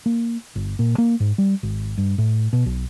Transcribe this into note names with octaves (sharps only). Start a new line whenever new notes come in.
A#3
G1
A#2
A#3
G#2
G3
G#1
G2
A2
B2
B1